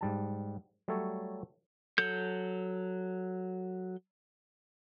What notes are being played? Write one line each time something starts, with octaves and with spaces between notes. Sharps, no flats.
G#2 G3 A5
F#3 G3 A3 A4 C#5
F#3 A4 G6